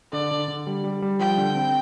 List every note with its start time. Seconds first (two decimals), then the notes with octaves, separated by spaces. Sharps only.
0.13 D3 D5
0.31 D3
0.48 D3
0.67 G3
0.84 G3
1.02 G3
1.19 F3 G5
1.37 D3
1.55 C4